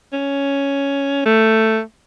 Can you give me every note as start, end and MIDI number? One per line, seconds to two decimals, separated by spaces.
0.13 1.24 61
1.25 1.81 57